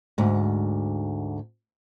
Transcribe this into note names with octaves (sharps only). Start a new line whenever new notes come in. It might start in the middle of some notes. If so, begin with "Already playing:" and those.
D2 G#2